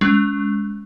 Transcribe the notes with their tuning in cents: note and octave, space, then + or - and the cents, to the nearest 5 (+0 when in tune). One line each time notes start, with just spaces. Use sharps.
G#3 +0 C#4 +35